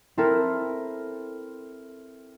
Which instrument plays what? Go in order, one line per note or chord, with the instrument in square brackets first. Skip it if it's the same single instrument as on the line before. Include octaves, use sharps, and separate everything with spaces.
[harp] C4 E4 A4 A#4